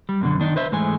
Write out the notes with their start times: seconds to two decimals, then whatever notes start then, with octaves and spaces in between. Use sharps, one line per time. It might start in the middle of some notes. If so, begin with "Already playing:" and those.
0.09 G3
0.21 F#2 B2 D3
0.40 D#3 D4 D#4
0.56 B4 C5 E5
0.72 G#2 E3 G#3 A3 G#5